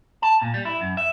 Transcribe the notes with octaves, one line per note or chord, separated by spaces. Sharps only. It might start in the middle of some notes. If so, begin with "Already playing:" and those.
A5
A#2
G3
E4
F#2
E5